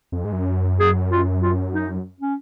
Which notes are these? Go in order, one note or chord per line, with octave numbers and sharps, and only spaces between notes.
F2
G#2
F#2
G#4
F4
F4
D#4
C#4